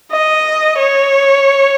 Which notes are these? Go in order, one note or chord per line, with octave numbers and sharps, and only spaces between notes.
D#5
C#5